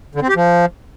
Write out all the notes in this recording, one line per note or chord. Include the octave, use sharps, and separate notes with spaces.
D3
C4
G4
F3